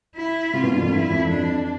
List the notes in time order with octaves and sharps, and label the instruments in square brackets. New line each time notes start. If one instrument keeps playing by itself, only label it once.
[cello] E4
[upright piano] C3 [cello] F4
[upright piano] B2
G2
F2
[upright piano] G2 [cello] E4
[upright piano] F2
[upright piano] F2 [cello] D4